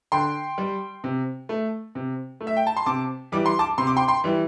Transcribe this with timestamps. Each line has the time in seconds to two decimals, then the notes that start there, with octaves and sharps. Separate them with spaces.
0.12 D3 G5 C6
0.58 G3
1.04 C3
1.49 A3
1.95 C3
2.41 A3
2.47 E5
2.57 G5
2.67 A5
2.77 C6
2.86 C3 A5 D6
3.32 E3 G3 D6
3.46 C6
3.59 A5 D6
3.78 C3 C6
3.87 D6
3.96 G5 C6
4.08 G5 C6
4.24 E3 G3